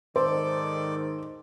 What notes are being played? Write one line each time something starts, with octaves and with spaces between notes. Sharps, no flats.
G#2 D#3 A4 C5 D5 D6